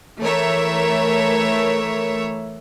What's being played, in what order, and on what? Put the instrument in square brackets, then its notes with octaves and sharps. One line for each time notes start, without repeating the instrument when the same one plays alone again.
[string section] E3 A3 A#4 C#5 E5